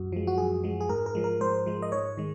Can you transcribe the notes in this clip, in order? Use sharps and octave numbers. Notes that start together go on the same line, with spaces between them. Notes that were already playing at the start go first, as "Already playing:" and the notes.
Already playing: F#2 F#4
F3 G#3
F#4
F#2 G#4
F3 G#3
G#4
G#2 A#4
A#4
F3 G#3
A#4
G#2 C5
F3 G#3
D#5
G#2 C#5
D#3 G#3